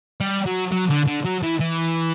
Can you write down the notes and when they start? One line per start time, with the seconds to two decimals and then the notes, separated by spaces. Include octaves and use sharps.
0.21 G3
0.46 F#3
0.72 F#3
0.90 D3
1.08 D3
1.25 F#3
1.43 E3
1.60 E3